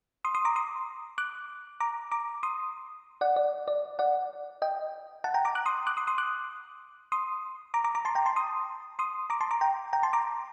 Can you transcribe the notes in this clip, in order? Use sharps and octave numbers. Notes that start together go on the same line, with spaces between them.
C6 D#6
C6 D#6
A#5 D6
C6 D#6
D6 F#6
A#5 D6
A#5 D6
C6 D#6
D5 F#5
D5
D5
D5 F#5
D#5 G5
F#5 A5
G5 A#5
A#5 D6
D6 F#6
C6 D#6
D6 F#6
C6 D#6
C6 D#6
D6 F#6
C6 D#6
A#5 D6
A#5 D6
A#5 D6
A5 C6
G5 A#5
A5 C6
C6 D#6
C6 D#6
A#5 D6
A5 C6
A#5 D6
G5 A#5
G5 A#5
A5 C6
A#5 D6